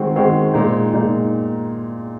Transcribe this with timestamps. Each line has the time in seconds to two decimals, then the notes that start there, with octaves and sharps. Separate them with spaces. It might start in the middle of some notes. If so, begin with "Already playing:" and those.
Already playing: D#3 G#3 C4 F#4
0.16 D#3 G#3 C4 F#4
0.54 A#2 G#3 D#4
0.93 A#2 G#3 D#4